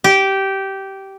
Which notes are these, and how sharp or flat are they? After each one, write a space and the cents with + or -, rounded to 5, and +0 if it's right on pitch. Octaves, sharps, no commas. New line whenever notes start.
G4 -15